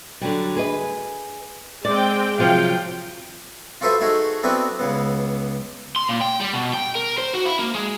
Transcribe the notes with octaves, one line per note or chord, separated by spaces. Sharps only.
D3 F#3 G3
G#4 B4 D#5
G#3 C4 D5 G5
C3 F3 F#3 F5 G5
F4 F#4 A4 B4 C5 E5
A3 D#4 F#4 G#4
B3 C4 D4 E4 F#4 B4
C#2 C#3 B3
C6
A#2
G5
G3
B2
G5
A#4
C5
F#4
E4
A#3
G#3